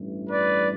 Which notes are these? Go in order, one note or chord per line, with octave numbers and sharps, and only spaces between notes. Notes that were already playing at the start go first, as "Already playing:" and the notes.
Already playing: A1 G2 E3
B4 D5